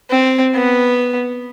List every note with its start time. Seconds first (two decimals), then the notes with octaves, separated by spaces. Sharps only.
0.11 C4
0.55 B3